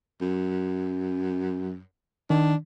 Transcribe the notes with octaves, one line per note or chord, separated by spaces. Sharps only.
F#2
D#3 D4